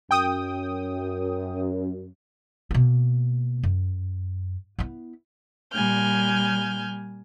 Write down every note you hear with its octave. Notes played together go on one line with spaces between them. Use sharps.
F#2 G5 D#6
B2 A#3
F#2
B3 E4
A#2 G3 G#5 F6 G6